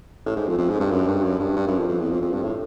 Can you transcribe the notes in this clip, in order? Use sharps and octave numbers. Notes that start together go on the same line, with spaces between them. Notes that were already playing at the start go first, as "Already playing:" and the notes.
A2
G#2
F2
F2
G#2
G2
F#2
G2
F#2
G2
G2
F#2
F2
F2
E2
F2
F2
G2
A2